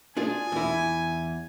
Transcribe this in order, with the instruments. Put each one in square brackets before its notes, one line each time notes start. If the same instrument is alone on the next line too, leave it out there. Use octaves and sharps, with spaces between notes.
[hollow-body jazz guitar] D4 F4 G#4 [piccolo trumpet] G#5
[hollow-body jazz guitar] E2 E4